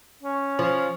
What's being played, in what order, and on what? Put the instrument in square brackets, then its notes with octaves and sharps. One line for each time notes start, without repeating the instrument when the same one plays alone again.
[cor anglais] C#4
[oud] F3